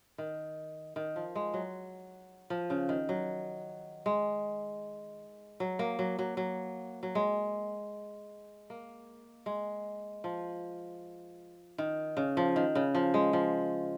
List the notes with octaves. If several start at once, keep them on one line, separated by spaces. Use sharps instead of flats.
D#3
D#3
F3
G#3
F#3
F3
C#3
D#3
F#3
G#3
F#3
A#3
F#3
F#3
F#3
F#3
G#3
A#3
G#3
F3
D#3
C#3
F3
D#3
C#3
F3
G#3
F3